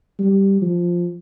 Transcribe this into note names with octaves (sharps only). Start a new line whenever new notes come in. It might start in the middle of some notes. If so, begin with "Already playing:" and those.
G3
F3